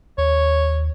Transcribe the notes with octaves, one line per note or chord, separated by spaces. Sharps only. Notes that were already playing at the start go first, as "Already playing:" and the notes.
D#2 C#5